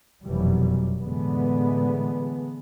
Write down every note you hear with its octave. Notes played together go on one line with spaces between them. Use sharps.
F1 F#2 B2 E3 F#3 G3
A2 D3 E3 G#3 B3